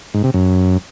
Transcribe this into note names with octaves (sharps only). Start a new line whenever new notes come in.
G#2
C3
F#2